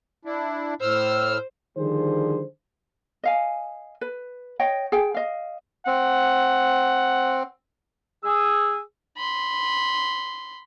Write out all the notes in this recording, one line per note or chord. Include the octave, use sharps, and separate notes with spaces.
D4 E4
A2 C5 E6 F6
D3 D#3 F3 G3 G#4 C5
D#5 F5 G#5
B4
C#5 D#5 G5
G#4 G5
D#5 F5
C4 F#5
G#4 E6
B5 C6